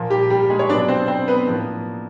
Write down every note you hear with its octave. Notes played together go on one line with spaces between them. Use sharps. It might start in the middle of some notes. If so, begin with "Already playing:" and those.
Already playing: A#2 F3 A#3
G3 G4
G3 G4
G#3 G#4
C#5
B2 F#3 B3 D4 D5
C4 C5
C4 C5
B3 B4
A2 F3 A#3